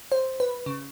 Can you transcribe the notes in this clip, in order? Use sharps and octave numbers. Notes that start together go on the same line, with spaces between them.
C5
B4
C#3